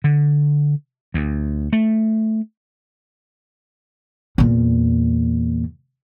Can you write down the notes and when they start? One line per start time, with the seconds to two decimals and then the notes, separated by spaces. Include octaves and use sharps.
0.04 D3
1.14 D2
1.73 A3
4.38 E2 A#2